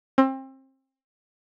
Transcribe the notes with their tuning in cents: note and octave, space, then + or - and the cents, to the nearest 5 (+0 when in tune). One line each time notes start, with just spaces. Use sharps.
C4 +30